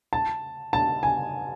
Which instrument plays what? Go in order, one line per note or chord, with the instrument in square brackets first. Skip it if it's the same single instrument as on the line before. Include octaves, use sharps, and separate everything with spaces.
[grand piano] A5
A5
G#5